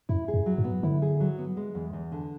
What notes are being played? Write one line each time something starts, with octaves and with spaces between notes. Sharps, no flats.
F#2 E4
G#4
F#2
F#3
G#2
B3
D3 E4
G#4
F#3
B3
G#3
E2
E2
D3